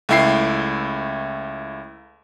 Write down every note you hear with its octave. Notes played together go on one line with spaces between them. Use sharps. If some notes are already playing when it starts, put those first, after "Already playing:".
C#2 A3 E4 G5 C7